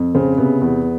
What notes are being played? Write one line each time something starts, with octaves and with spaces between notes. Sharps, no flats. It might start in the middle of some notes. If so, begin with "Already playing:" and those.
Already playing: F2
C#3 C4
C3 B3
E2